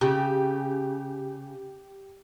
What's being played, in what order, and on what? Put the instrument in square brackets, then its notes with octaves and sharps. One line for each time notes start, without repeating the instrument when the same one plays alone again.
[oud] C#3 [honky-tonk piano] G4